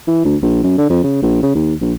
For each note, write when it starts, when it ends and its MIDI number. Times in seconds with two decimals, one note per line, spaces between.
0.08 0.21 52
0.24 0.36 38
0.42 0.62 34
0.63 0.73 42
0.77 0.86 50
0.90 1.01 41
1.03 1.20 49
1.22 1.39 34
1.42 1.55 49
1.55 1.74 39
1.81 1.93 34